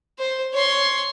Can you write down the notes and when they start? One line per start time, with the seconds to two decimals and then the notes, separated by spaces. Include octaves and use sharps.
0.18 C5
0.54 C#5 C6